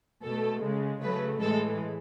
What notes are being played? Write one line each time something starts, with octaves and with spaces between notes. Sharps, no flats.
B2 A3 A4
C#3 G#3
C#3 F#3 A3 B4
A2 E3 G#3 A4